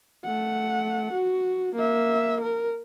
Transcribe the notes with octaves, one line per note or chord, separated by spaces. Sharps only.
A3 F#5
F#4
A#3 E5
A#4